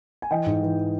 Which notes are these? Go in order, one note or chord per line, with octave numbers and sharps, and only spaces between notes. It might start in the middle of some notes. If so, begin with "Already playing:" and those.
G#5
E3 D#5 G5
G#2
E3